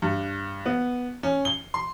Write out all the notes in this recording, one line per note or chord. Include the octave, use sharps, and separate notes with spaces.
G2
B3
C#4
G7
C6